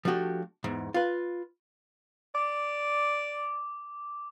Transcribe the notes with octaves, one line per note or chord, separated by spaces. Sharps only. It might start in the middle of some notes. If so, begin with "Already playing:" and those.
F3 A3 D4 F#4 G4
E2 G#2
F4 B4
D5 D6